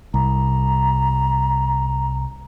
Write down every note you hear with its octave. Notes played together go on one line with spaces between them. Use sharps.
C2 A#5